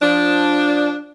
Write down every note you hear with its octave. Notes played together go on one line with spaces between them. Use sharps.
F3 D4